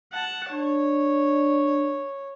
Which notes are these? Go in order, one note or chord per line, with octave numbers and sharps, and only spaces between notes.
F#5 A5
D4 C#5